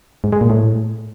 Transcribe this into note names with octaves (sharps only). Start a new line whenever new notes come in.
G#2
G#3
A#2
A2